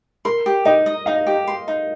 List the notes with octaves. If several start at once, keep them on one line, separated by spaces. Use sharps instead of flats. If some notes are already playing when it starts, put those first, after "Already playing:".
A#4 C6
G4
D#4 D#5
D#5
D#4 F5
G4
C6
D#4